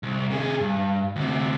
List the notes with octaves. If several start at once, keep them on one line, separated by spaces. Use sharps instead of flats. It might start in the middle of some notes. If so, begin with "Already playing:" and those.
C2
C3 G#4
G2
D2 C3